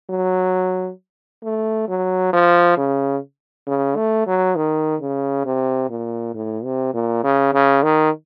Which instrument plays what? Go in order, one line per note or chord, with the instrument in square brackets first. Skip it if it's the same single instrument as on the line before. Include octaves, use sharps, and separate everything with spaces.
[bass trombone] F#3
A3
F#3
F3
C#3
C#3
A3
F#3
D#3
C#3
C3
A#2
A2
C3
A#2
C#3
C#3
D#3